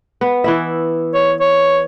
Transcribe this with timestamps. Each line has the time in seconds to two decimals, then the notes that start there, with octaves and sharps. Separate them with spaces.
0.21 B3
0.44 E3 E4 E5
1.14 C#5
1.40 C#5